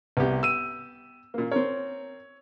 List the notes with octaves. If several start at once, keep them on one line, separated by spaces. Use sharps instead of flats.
C2 B3 G4
E6 D#7
A#2 A#3
C4 A#4 C#5